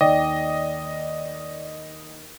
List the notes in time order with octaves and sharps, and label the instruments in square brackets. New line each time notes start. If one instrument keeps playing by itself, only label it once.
[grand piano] D#2 [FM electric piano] D5 [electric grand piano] D#5 [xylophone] G5